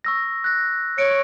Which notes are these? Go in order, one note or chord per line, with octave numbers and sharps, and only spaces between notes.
C#6 E6 A#6
F#6 A#6
C#5 C#7 D7